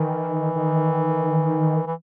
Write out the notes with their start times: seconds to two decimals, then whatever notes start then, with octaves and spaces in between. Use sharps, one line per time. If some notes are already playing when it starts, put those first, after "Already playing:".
Already playing: D#3 E3
0.56 D#3
1.86 E3